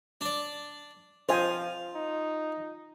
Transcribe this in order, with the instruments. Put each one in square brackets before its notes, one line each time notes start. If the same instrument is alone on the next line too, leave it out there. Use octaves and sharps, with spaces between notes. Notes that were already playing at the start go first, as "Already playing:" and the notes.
[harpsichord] D4 D5
[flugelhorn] F3 [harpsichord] F4 [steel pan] C5 D#5 G#5
[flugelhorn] D#4